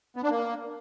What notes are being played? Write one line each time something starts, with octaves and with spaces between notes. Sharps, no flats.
B3
D4
A#3